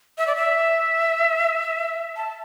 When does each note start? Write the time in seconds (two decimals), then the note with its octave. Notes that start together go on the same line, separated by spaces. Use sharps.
0.18 E5
0.27 D5
0.35 E5
2.16 A5